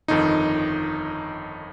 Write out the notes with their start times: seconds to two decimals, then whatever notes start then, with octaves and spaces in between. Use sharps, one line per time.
0.08 G1 F2 D#3 D#4